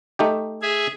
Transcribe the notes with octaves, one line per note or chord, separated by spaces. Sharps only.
A3 D#4 G4
G#4 E5 G#5